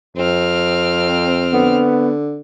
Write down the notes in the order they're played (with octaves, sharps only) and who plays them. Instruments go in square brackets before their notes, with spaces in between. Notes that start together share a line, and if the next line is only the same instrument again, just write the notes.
[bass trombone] F2 [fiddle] C4 F6
[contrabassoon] D3 [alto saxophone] B3